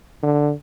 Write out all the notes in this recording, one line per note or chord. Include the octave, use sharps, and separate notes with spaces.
D3